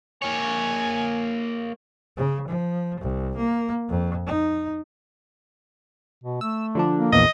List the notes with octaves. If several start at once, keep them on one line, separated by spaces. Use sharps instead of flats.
A#3 C#5 G#5
C#3
F3
C2
A#3
F2
D#4
B2
A3 E6
D3 F3 D4
A#3
A#1 E2 A#2 D#5